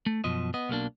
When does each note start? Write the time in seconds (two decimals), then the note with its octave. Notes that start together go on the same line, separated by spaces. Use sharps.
0.06 A3
0.24 F#2 B2 F3 D#5
0.54 B3 D#5
0.69 B1 B2 A#3 D4